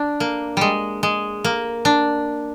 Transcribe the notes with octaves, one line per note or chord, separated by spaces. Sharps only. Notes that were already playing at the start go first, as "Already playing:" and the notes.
Already playing: D4
A#3
G3 G#3
G#3
A#3
D4